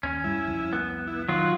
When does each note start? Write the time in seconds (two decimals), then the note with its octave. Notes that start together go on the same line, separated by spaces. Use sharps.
0.03 D#2 C#4
0.24 G2 G3 E4
0.47 C2 F2
0.73 B3
1.07 E4
1.29 D#3 F#3 F4 F#4